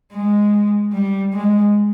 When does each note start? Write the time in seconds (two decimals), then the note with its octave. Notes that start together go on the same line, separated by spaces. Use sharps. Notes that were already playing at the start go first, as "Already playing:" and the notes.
0.13 G#3
0.93 G3
1.33 G#3